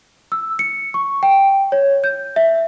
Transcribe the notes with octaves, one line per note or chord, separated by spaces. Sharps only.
E6
C#7
C#6
G5
C#5
G6
E5